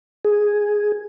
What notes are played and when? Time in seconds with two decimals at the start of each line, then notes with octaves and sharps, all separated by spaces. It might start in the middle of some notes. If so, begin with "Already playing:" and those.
0.25 G#4